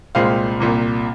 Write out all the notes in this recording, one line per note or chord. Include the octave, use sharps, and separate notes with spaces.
C2 A#2 G#3 C4 F5
C2 A#2 A#3